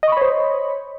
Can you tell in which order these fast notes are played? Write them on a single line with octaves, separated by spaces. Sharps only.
D#5 C#6 B5 C#5 C5